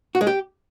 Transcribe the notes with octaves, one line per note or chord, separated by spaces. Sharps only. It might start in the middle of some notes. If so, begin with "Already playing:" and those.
F#4
G#3
G4